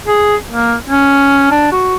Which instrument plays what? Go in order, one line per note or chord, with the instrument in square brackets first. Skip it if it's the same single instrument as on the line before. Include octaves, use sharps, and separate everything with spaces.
[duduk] G#4
A#3
C#4
D4
F#4